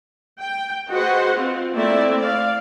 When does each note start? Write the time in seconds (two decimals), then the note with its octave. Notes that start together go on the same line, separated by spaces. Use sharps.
0.40 G5
0.91 F#4 G#4 B4 C5 D#5 F#5
1.35 C4 F4
1.74 A3 A#3 C4 E4 D5 E5
2.20 D5 F5